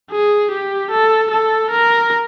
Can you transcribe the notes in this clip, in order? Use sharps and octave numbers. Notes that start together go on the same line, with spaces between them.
G#4
G4
A4
A4
A#4